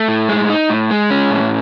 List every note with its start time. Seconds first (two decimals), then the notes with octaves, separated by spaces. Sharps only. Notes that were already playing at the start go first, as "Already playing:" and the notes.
Already playing: A3
0.09 A2
0.29 G#3
0.50 D#4
0.70 A2
0.91 G#3
1.11 C#4
1.31 A2